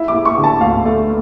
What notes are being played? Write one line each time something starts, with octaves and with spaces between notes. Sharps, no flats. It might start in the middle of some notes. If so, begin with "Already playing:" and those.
Already playing: E4 E5
D6
E4
C#6
D3
A5
D2 F5
A3